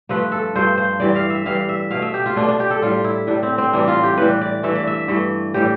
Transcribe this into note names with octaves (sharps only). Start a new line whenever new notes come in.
G2 F3 A3 B4
A4
G2 F3 A3 C5
C5
G2 E3 G3 D5
F5
E5
G2 E3 G3 F5
E5
B2 A3 F5
E5
G4
F4
B2 A3 D4
D4
G4
A4
A2 G3 F4
E4
A2 G3 D4
C4
C4
A2 E3 G3 D4
F4
G4
A2 E3 G3 B4
D5
G2 E3 A3 E5
D5
E5
G2 E3 A3
A2 E3 G3 G4